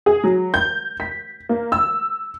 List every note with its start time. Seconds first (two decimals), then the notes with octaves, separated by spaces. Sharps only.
0.06 G#4
0.24 F#3
0.54 G6
1.00 B6
1.49 A#3
1.72 E6